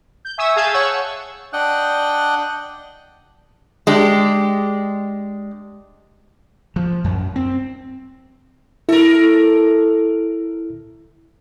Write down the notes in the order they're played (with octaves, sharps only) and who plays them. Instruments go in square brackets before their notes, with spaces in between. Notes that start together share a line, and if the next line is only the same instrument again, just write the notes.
[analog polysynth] G6
E5 G#5 C#6 D#6 E6
G#4 F5 G#5 A5 G6 G#6
C#5 F#5 C#6 E6
[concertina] D4 D#5 F#5 G5 F#6
[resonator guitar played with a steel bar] G#3 D4 G4
[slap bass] F3
F#2
C4
[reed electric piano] E4 [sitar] A4 A#4